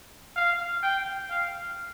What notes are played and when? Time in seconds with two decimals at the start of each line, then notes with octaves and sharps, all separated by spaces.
0.36 F5
0.83 G5
1.31 F5